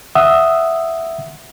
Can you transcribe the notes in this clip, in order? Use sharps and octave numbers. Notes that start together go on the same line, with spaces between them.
E5 F#5 D#6 E6